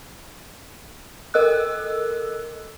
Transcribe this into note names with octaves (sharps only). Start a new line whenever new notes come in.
A4 A#4 D#5 E6 F#6